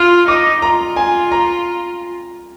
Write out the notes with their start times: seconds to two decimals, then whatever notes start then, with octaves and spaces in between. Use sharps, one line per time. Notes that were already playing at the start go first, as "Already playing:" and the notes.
Already playing: F4 F6
0.28 D#4 D6
0.62 F4 A#5
0.96 G#5
1.32 A#5